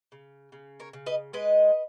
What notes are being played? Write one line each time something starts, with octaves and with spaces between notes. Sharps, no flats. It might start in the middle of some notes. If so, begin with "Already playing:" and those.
C#3
C#3
A#4 C#5
C#3
B4 D#5
G#3 B4 D#5